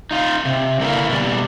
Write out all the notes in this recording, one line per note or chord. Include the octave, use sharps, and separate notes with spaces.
D#4 F4
C3
D3 A#3 E4 B4 F5
B2 G3